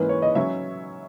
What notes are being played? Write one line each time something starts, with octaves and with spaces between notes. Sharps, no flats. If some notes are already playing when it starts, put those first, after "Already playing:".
Already playing: G#2 E3 A#3 C#4 B4
C#5
D#5
F#3 C#4 E5